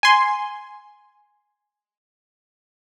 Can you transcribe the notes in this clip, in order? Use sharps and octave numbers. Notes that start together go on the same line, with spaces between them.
G#5 C6